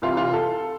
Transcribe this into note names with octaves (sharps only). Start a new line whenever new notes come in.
C2 C3 E3 F4
F4
A4